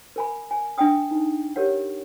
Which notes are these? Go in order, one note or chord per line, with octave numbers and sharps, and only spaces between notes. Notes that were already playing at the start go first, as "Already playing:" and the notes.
A#4 G#5 B5
G#5
D4 D#5 F#5 G5 D#6
D#4
G4 A#4 C#5 F#5